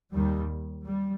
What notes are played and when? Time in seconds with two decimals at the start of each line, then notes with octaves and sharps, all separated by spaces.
0.13 D#2 D#3 G3
0.86 G3